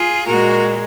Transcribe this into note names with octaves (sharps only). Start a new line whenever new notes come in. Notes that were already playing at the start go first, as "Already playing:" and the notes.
Already playing: F4 G#4
A#2 G#3 F#4 A#4